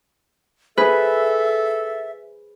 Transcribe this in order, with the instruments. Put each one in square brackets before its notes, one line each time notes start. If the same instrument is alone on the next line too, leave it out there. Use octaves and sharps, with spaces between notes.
[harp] G#4 B4 [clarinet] A4 [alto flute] E5